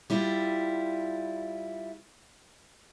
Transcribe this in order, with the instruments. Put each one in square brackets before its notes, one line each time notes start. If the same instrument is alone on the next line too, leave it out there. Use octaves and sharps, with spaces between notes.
[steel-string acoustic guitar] G3 E4 F4